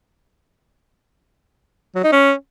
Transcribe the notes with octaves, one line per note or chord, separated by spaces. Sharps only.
F#3
D#4
C#4